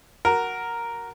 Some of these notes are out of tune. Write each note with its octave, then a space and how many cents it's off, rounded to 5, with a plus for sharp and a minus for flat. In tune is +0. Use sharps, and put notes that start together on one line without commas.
F#4 +5 A#4 +0